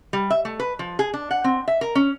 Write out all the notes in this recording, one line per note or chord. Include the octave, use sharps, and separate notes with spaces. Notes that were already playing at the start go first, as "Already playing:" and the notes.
G3
E5
A3
B4
F3
G#4
D4
F#5
C4
E5
A#4
C#4